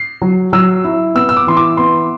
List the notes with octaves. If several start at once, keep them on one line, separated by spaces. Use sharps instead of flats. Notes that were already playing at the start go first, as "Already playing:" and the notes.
Already playing: C7
F#3
F#3 E6
E4
B3 E6
E6
D6
E3 C6
D6
B3 C6